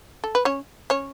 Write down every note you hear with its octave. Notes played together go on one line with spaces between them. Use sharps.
A4
B4
C#4 C#5
C#4 C#5